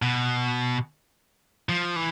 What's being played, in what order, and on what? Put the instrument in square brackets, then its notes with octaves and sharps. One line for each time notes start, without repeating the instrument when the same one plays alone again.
[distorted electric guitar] B2
F3
E3